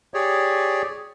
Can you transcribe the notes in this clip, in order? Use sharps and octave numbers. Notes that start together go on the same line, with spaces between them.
G4 G#4 C#5 D5